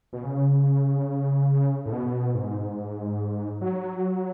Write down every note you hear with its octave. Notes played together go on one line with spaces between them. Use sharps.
B2
C#3
A2
B2
G#2
F#3